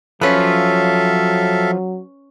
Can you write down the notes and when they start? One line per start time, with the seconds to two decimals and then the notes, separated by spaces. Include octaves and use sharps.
0.21 F3 F#3 C#4 F4 A4 B4 E5 F5